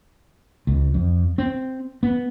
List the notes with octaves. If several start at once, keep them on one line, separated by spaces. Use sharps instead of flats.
C#2
F2
C4
B3